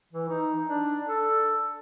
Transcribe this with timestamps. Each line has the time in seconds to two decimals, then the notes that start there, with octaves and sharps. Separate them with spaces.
0.13 E3
0.29 D#4
0.69 D4
1.08 A4